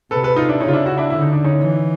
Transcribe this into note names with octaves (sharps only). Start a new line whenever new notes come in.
C3 A4 B4
A4 B4
D#4 F4
D4 E4
C#3 C#4 D#4
F4
D4 E4
E4 F#4
D4 E4
D3 E4
D#4
D4
C#4 D#4
E3